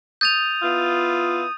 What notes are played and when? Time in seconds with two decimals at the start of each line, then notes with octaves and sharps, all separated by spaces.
0.21 D#6 G6 A6 F7
0.62 B3 E4 F4